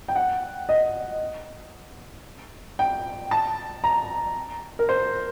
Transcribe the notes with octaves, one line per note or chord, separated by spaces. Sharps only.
G5
F#5
D#5
G5
A5
A#5
A#4
C5